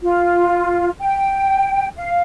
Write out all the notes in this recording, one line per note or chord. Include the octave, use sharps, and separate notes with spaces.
F4
G5
F5